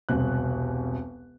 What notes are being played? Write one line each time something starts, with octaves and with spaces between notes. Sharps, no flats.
E1 C2 F#6